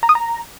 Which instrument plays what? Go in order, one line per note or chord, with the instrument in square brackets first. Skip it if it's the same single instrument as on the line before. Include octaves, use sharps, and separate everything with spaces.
[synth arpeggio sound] A#5
D#6
A#5